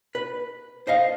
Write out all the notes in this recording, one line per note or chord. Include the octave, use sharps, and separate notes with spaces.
B4
C5 D#5 F5